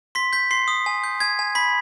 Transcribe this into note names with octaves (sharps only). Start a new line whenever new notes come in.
C6 B6
G6 B6
C6 C7
D#6
G#5
G6
G#5 G#6
G#5
B5 B6